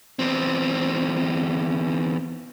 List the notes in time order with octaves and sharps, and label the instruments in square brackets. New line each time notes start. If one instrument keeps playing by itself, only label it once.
[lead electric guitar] E2 C4